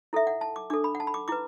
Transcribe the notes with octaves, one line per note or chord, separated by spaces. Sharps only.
E4 A4 E5
F#5
A5
D6
D4 A4 D6
B5
F#5
A5
B5
D6
E4 B4 D6